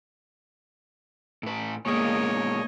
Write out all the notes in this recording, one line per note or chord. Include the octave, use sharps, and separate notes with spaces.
A2 B4
A#2 G#3 A#3 B3 C#5 D#5